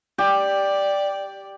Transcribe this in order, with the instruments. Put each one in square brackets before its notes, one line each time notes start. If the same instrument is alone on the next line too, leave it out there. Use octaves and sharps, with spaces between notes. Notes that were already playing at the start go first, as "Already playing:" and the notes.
[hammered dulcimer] G4 [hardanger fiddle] D5